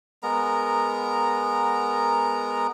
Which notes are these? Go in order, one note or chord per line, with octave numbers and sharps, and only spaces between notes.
G#3 B3 A#4 A#5